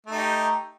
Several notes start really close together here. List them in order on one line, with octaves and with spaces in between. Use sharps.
A3 D#4 G4